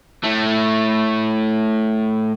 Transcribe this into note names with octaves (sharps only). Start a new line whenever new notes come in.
A2 A3